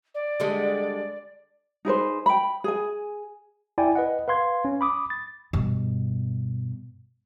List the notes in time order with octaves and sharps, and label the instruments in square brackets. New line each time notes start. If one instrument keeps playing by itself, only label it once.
[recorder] D5
[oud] D3 G3 G#3
[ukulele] D#4 G#4 B4 C5
G5 B5
G#4 G#5
[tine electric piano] E4 D5 G5 G#5
B4 D#5 F#5
B4 F5 C6 G#6
C#4
B5 D6 D#6
A6
[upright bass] G2 B2